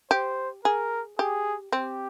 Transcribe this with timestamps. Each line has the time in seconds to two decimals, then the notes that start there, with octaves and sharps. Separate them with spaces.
0.11 G4 C5
0.65 G#4 A#4
1.19 G4 G#4
1.72 C4 G4